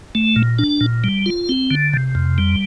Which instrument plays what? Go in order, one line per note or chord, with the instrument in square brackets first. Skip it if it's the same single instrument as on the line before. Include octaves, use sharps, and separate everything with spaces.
[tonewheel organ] A3
A#2
D4
A#2
G3
F4
C4
D3
C3
F2
G3